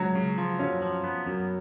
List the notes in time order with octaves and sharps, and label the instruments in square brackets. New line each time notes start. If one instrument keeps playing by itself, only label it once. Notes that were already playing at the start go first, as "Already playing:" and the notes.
Already playing: [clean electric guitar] C#2 [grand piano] F#3
[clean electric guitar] C#3
F3
[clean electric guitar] F#2 [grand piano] C#4
[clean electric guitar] F3
B3
F#2